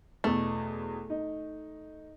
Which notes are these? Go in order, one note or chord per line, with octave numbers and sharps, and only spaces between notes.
E2 B2 A3
D#4